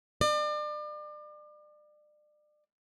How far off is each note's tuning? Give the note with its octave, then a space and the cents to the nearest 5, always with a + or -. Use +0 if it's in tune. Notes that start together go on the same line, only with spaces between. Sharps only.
D5 +35